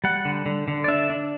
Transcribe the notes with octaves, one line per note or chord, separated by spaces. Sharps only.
G3 F#5
D3
D3
D3
D5
D4 E5
D4